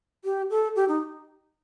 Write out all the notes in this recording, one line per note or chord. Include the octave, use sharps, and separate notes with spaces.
G4
A4
G4
D#4